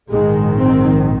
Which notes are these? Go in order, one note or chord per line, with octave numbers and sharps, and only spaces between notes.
A#1 G#2 D#3 G#3
C4